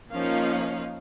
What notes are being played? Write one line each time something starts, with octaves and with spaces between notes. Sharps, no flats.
F3 A#3 C#4 D#4 F5